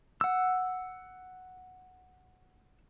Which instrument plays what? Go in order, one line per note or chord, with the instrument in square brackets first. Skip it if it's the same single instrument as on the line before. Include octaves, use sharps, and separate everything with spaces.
[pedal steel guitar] F#5 E6